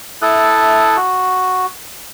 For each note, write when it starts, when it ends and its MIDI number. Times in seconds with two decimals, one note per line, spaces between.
0.22 0.97 64
0.22 0.97 69
0.22 0.97 76
0.22 0.97 81
0.22 0.97 87
0.22 0.97 90
0.97 1.66 66